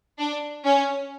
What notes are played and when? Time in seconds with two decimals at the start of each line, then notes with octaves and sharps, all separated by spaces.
0.18 D4
0.64 C#4